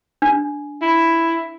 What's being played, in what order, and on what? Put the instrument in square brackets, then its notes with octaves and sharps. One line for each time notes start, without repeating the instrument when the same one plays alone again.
[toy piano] D4
[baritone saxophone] E4